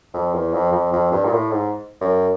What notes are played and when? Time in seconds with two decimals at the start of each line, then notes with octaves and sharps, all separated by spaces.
0.14 F2
0.34 E2
0.53 F2
0.72 F2
0.93 F2
1.12 G2
1.25 A#2
1.32 A2
1.52 G#2
2.01 F#2